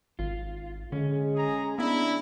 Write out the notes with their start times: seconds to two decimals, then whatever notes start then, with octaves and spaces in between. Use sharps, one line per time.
0.19 G#1 F4
0.92 D3 G#3 C#4
1.35 G#4 A#5
1.78 B3 D4 E4